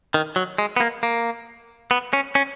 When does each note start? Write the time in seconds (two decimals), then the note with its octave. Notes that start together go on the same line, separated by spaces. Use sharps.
0.14 D#3
0.36 F#3
0.58 G#3
0.77 B3
0.80 A#3
1.03 A#3
1.91 B3
2.13 C#4
2.35 C#4